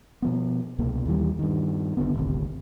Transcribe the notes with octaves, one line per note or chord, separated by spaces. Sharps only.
B2 F3 B3
C2 B2 A#3
D#2 E3 G3
G2 D#3
F#1 D#2 D3 B3
D#1 G#1 D2 C3